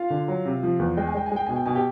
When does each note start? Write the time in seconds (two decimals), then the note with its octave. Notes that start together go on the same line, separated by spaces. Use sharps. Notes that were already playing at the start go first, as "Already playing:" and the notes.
Already playing: F4 F5
0.10 D3
0.28 F#3
0.46 C3
0.63 F3
0.79 E2
0.97 G#3 G5
1.07 G#5
1.15 G#3 G5
1.26 G#5
1.32 G#3 G5
1.46 B2 G#5
1.56 G5
1.66 B2 G#5
1.75 G4 G5